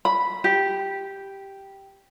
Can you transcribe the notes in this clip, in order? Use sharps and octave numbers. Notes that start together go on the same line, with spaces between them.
B5
G4